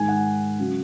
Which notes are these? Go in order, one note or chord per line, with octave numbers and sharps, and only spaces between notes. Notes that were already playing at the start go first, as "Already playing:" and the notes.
Already playing: G#2 D#3 G#3 G#5
F#5
C#3 F#3